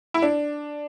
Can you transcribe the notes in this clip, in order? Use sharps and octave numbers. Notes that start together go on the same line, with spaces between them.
E4
D4